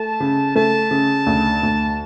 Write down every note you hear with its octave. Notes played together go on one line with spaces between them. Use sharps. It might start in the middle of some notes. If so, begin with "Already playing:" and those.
Already playing: A3 A5
C#3
A3 A5
C#3
D2
D2